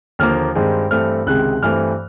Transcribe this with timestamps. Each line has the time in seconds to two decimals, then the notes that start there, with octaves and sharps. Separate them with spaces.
0.19 D#2 D3 F3 A#3 F6
0.55 G2 D#3 G#3 C4
0.91 G2 E3 A3 C4 F6
1.26 C#2 C3 D#3 G#3 F#6
1.62 G2 E3 A3 C4 F6